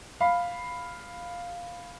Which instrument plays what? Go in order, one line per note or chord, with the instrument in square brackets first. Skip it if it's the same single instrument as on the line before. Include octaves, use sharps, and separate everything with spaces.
[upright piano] F5 B5